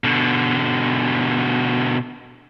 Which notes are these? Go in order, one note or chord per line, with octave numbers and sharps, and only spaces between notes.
B2 D3